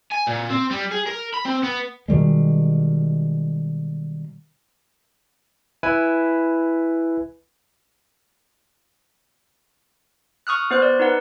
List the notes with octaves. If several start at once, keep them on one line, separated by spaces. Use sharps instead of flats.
G#5
A#2
C4
G3
G#4
A#4
B5
C4
B3
B2 D#3 G3 G#3
E4 B4 G#5
C#6 D#6 F6 F#6
B3 C5 F#6
D5
D#4 B4 F#5